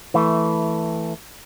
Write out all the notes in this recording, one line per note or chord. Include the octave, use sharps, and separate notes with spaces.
E3 A3